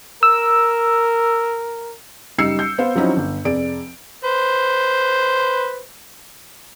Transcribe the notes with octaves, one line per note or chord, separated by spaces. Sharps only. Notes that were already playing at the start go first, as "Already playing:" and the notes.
A#4 E6
F#1 G3 D#4 E6 C7 C#7
G6
B3 C5 F5
F3 F#3 C4 C#4 D#4 E4
G1
F1 G#4 D5 D7
B4 C5